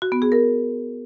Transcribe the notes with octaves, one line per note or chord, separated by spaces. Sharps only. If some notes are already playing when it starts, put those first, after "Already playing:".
F#4
B3
G#4
A#4